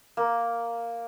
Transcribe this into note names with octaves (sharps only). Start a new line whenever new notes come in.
A#3 A#4